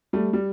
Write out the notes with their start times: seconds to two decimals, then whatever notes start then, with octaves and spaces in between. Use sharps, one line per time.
0.13 G3 A3
0.33 G3